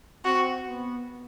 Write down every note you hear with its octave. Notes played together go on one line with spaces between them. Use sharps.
C4 F#4
B3